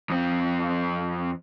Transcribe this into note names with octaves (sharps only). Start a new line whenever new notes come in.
F2 C4